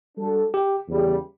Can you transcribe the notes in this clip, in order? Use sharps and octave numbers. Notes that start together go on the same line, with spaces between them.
G3 D4 F#4 A4
G4
E2 C#3 G3